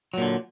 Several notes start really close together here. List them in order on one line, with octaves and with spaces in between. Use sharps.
F#3 A#2 D3